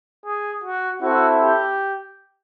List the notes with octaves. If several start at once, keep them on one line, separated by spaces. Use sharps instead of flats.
G#4
F#4
C4 E4 F#4 A4 C5 E5
G4